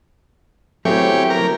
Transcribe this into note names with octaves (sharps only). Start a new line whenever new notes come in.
F#3 A3 B3 C4 E4 G4 G#4 C#5
A#4